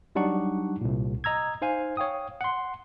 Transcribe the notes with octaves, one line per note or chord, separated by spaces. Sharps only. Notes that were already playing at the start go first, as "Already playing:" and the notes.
F#3 G3 D4 D#4 F#5 C#6
C2 A#2
D#5 A#5 E6 G#6
D#4 C5 F5 G#5
C#5 F5 G5 D#6
F#5 C6